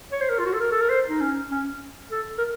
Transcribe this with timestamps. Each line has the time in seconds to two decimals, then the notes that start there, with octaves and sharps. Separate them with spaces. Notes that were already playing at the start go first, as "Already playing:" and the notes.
0.12 C#5
0.21 C5
0.30 A#4
0.39 F4
0.46 F#4
0.53 A4
0.60 A#4
0.72 A4
0.81 A#4
0.90 C5
1.09 D#4
1.21 C#4
1.51 C#4
2.12 A4
2.38 A#4